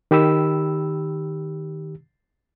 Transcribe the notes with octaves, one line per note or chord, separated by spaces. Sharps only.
D#3 G4 B5 E6